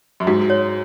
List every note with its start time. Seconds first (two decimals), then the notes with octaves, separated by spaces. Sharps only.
0.20 F#2
0.27 G#2 F#4
0.50 C#5